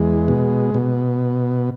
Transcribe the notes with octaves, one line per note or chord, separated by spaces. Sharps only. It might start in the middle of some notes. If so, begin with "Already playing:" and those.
Already playing: E2 G#3
B2
B2